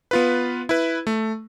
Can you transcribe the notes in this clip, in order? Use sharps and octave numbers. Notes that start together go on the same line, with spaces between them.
B3 F4 B4
E4 B4
A3